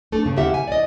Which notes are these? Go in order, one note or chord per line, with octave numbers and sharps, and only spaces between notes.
A3 D4 A4
G2 C#3
D#2 C#3 A#3 G4 E5 F#5
G#5
D5 D#5